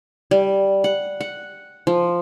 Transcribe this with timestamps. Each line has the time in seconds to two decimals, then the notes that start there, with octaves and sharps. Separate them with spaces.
0.31 G3
0.84 F#5
1.21 F#5
1.87 F3